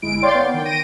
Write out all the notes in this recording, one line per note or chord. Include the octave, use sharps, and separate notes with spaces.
G1 G#3 E4 D7
C#5 D5 F5 G5 C6 A6
B3
D#3 G5
A#6 D7 D#7